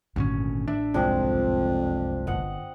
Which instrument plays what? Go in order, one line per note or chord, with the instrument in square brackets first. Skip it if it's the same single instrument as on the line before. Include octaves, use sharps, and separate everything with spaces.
[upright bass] G#1 G2 [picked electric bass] D2 A#2 C#4
[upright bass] A1 [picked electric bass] D4 [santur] E5
[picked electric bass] F#1 C2 G#3 [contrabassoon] F2 [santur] F3 C4 D4
[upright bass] G1 [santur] D#5 F#5